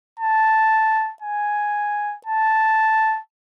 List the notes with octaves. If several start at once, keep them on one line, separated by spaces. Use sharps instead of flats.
A5
G#5
A5